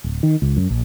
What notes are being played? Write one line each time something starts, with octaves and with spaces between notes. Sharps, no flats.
D1
D#3
C#2
F#2
A#1